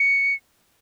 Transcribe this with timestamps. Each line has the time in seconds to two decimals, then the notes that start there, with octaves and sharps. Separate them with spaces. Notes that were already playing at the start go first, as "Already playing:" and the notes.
Already playing: C#7